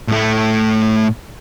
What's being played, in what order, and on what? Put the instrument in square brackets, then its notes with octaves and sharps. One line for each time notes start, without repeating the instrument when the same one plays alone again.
[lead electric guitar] A2 A3